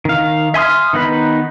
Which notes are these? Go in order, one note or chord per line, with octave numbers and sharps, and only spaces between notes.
D#3 F5
E5 G#5 C6 D#6 F6
D#3 B3 D#4 B4 B5